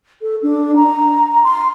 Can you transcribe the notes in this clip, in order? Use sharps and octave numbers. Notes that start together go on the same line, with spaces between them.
A4
D4
A#5
C6